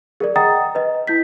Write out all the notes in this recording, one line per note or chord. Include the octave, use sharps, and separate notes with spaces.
G#4 A#4 D5
D#5 F#5 G5 A#5 D#6 A6
B4 D#5
E4 G6 B6